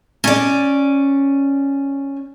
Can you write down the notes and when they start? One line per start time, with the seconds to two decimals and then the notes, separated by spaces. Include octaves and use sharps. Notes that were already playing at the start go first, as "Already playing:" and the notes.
0.24 C#4 D5